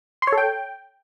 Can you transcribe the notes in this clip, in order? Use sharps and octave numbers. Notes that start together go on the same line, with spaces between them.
C6
C#5
A4
G5